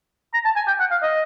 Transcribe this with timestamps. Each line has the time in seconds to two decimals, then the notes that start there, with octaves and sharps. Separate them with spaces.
0.34 A#5
0.45 A5
0.56 G#5
0.68 G5
0.80 F#5
0.91 F5
1.02 D#5